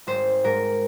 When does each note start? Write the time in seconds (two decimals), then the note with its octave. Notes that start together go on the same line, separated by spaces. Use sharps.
0.07 G#1 C5
0.44 G#2 A#4